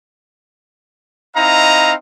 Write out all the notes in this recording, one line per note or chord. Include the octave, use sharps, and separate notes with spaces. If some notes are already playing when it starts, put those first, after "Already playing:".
C4 D#4 E4 D#5 F5 A#5